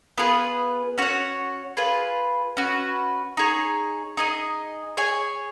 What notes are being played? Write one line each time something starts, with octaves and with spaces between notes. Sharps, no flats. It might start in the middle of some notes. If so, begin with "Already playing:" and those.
B3 F4 G#4 B4
C#4 F#4 C#5 F#5
F4 G#4 B4
C#4 F#4 B4
D#4 G#4 C#5
D#4 G#4 D#5
G#4 C#5 G#5